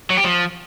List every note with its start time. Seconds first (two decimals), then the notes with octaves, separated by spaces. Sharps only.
0.10 F#3
0.17 G4
0.24 F3